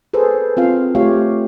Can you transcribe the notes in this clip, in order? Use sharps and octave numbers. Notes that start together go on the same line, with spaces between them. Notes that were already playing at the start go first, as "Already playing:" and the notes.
G#4 A4 B4 C5
C4 F4 F5
A3 F4 G4 C#5 F5